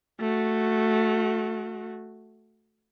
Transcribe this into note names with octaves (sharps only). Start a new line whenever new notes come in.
A3 F#4